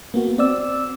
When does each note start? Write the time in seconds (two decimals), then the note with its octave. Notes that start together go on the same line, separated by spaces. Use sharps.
0.14 A#3 B3 F#4
0.38 C4 D5 E6